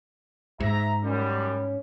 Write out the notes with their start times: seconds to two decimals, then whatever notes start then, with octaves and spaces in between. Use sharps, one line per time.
0.60 G#2 E5 A#5
1.03 F#2 G3 C#4